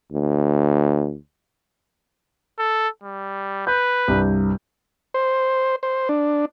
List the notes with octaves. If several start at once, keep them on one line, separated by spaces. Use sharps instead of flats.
D2
A4
G3
B4 G6
C2 G2
C5
C5
D4